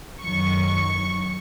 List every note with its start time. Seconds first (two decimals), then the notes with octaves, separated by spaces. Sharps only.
0.21 F#2 D#3 F#3 C#6